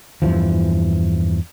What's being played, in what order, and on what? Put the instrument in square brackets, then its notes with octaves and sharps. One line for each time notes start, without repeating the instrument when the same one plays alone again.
[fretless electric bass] E2 G2 E3 F3